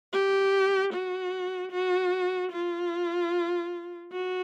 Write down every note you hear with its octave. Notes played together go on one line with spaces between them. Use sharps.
G4
F#4
F#4
F4
F#4